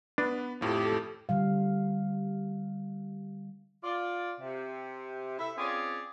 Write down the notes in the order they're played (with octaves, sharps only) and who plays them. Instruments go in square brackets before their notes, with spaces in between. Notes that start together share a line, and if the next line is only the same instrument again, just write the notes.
[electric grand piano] B3 B4 [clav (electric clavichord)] D4
[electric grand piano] F2 A2 F3 [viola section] G4 A4
[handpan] D3 G3 F5
[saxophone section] F4 D5
C3
E4 A4 B4 E5
C4 C#4 F4 G#4 C#5 D5